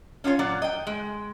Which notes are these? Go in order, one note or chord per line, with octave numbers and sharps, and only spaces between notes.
C#4 D4 F4 C#5
A#2 F#3 F4 D5
D#5 G5
G#3